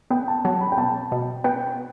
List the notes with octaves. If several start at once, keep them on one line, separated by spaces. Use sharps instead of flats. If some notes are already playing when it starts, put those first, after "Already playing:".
B3 G5
A5
F#3 A5
B5
G5
B2 A5
B2
B3 G5